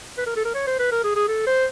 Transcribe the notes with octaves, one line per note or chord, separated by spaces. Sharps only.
B4
A#4
A4
A#4
C#5
C5
B4
A#4
G#4
G#4
A4
C5